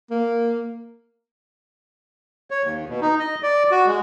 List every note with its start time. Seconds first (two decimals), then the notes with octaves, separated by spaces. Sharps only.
0.11 A#3
2.51 C#5
2.64 D#2
2.89 B2
3.01 D#4
3.20 D#5
3.43 D5
3.71 F#4
3.86 G#3